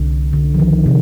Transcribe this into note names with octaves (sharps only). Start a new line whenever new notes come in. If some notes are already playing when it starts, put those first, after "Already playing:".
Already playing: C2 D3
D3
F3
D#3
C3